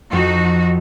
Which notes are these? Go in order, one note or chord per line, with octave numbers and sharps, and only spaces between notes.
F2 D#4 F#4